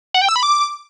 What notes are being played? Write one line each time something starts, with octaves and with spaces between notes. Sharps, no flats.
F#5
G5
E6
B5
D6